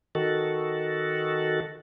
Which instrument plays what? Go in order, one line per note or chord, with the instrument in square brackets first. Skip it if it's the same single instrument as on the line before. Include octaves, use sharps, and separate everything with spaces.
[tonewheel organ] D#3 F#4 A4